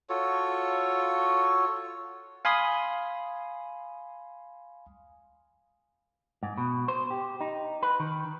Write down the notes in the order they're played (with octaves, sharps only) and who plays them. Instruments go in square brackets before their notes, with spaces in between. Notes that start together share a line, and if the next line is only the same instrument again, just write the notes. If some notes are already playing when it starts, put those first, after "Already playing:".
[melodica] F4 F#4 A4 C#5
[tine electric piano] F5 G#5 B5 C6 D#6
[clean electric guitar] G#2
B2
C5
G4
D#4
B4
D#3